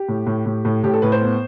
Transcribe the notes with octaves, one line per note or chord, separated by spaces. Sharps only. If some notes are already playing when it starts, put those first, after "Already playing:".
Already playing: G4
A2
A2
A2
A2
A2 G4
A4
A2 B4
C5
B3